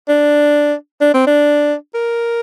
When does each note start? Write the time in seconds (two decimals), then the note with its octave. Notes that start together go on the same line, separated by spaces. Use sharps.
0.08 D4
1.01 D4
1.14 C4
1.27 D4
1.94 A#4